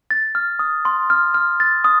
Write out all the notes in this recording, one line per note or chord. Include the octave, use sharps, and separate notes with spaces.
A6
F6
D#6
C6
F6
F6
A6
D#6